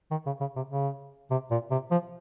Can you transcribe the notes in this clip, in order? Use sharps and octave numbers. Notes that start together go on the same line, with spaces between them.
D#3
C#3
C#3
C3
C#3
C3
A#2
C3
F3